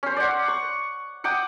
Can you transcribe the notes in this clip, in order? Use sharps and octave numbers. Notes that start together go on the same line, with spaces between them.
C#4 C5
D5 F#5
C#6
F#5 G5 D6 D#6